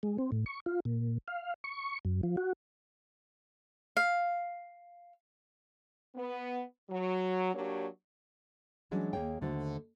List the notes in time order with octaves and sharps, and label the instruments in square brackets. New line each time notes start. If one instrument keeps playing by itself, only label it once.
[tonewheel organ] G#3
C4
A2
C#6
F4
A#2
F5
C#6
F#2
F3
F#4
[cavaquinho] F5
[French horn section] B3
F#3
F#3 A#3 D4 G4 C#5
[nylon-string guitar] E3 F#3 G#3 C#4 D4 F#4
D#2 A#3 G#4 C#5 G5
D#2 D3 A3 F#4 C5